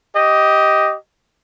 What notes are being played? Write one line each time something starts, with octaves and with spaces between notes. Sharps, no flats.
G4 D#5